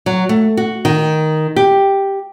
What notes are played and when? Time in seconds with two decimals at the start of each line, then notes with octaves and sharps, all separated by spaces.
0.06 F#3
0.29 A3
0.57 F#4
0.85 D#3
1.56 G4